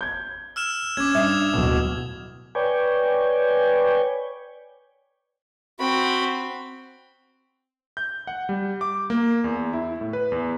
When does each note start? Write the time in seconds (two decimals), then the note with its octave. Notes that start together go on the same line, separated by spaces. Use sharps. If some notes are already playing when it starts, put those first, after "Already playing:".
0.01 G6 G#6
0.56 E6 F6 E7
0.97 C#4 D6 G#6
1.15 G2 E5 D#6 G#6
1.54 D1 B2
2.55 B4 C#5 D5 G5 G#5
5.79 C4 F#4 B5
7.97 G6
8.27 F#5
8.49 G3
8.81 D6
9.10 A#3
9.44 E2
9.73 E4
10.01 A2
10.13 B4
10.32 E2